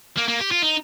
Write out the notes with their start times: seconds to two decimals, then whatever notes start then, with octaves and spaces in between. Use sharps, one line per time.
0.17 A#3
0.28 A#3
0.40 G4
0.51 F4
0.62 D#4